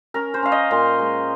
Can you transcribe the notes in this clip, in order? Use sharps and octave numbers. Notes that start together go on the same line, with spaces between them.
C#4 A#4
C5
C#4 F5
D#5
A#2 C6
G#3